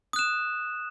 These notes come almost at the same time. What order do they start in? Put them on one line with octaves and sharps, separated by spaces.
D#6 F#6 E7